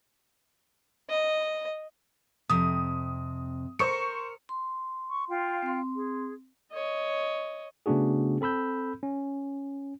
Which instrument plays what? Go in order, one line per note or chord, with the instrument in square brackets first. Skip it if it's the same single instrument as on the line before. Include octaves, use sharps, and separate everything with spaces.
[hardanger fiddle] D#5
[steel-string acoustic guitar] F2 C3 [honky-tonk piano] D#6
[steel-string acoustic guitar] A#4 [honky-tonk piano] C5 C#6 C#7
[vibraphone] C6
[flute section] C#6
F4 F5 G5
[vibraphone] C4 C6
[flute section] G#4
[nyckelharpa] C#5 D#5
[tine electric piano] C#3 A3 B3 D4 F#4 G#4
C4 A4 B5 E6 G6
C#4